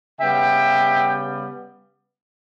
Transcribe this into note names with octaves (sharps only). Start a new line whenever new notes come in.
C#3 G3 B3 E5 G5